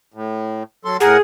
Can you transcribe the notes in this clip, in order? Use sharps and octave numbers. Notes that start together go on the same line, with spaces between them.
A2
F#3 A4 C6
A2 G#4 A#4 F#5